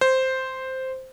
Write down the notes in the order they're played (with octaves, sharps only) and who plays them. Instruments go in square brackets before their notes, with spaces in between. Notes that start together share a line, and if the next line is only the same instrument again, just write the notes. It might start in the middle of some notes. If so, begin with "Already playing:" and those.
[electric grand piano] C5